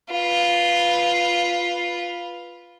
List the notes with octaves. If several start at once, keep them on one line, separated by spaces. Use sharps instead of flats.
F4 B4